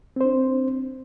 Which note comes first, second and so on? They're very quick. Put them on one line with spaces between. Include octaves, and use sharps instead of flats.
C4 C5 D4